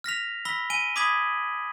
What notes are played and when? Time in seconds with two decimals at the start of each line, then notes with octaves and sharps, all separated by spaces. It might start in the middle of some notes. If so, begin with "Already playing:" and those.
0.04 F6 A#6 B6 F7
0.45 B5 E6 A#6 B6 G7
0.70 G#5 D7 D#7 G7
0.96 B5 D6 D#6 G#6 B6 F#7